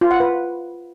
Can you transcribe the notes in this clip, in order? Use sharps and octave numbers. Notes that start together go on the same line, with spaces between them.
F4
F#5
B4